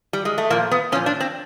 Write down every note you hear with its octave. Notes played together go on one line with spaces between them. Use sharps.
G3
G#3
A3
A#2 F3 A#3
B3
A#2 F3 C#4
D4
C4